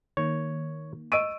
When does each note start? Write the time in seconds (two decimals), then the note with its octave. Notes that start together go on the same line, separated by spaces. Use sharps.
0.17 D#3 A#3 C#5
1.12 D#5 C#6 E6 D7 D#7